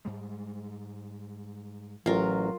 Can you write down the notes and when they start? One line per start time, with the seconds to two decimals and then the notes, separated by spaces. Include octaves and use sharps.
0.05 G#2 G3 G#3
2.06 A1 F#3 F4 A#4